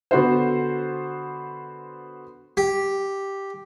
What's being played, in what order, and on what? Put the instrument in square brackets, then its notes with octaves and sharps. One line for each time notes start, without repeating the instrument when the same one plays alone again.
[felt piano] D3 B3 F#4 A4 C5
[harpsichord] G4